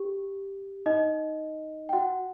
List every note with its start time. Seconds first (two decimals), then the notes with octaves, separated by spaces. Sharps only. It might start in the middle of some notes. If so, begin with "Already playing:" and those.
Already playing: G4
0.86 D#4 D#5
1.89 G5
1.93 F#4 F#5